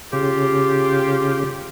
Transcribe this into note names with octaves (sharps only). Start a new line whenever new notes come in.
C#3 F4 G4